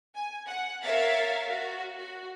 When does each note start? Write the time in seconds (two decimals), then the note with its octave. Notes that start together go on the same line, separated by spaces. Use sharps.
0.15 G#5
0.47 F#5
0.83 A#4 C#5 E5 F5 A6 B6
1.46 F#4
1.97 F#4